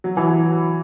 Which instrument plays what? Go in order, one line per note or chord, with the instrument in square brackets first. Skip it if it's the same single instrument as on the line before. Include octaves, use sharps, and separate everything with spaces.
[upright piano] F#3
E3
F#3